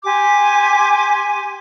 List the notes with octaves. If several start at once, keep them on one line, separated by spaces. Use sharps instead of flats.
G4 G#5 C6 D6